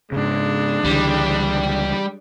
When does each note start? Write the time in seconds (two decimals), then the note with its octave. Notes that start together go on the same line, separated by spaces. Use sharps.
0.12 G#2 C#3 G#3 D4
0.84 C#2 D3 E3 G3